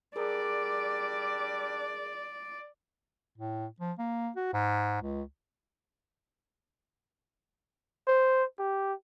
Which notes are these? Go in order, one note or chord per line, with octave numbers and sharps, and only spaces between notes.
G3 D4 G#4 A#4 D5 D6
A2
F3
A#3
F#4
G#2
C#2
C5
G4